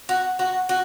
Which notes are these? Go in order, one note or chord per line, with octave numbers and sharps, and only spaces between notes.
F#4
F#4
F#4